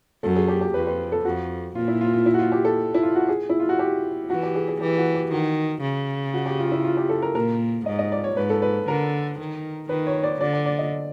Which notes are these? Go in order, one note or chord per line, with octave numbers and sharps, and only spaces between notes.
F#2 A4
G#4
G4
G4
F2 B4
B4
A4
F2 F#4
A#2 F4
E4
F4
F4
E4
F#4
F4
G4
A4
E4
F4
F#4
G#4
E4
F4
F#4
G4
E3 F#4
G4
G#4
G#4
E3 G4
F#4
G4
D#3 F#4
C#3
F#4
G4
F4
E4
F4
G4
A4
A#4
A#2 A#4
G#2 D#5
D#5
D5
C#5
G#2 B4
A4
B4
D3 A#4
D#3
D#3 B4
C#5
D5
D3 D5
D5
D5
D#5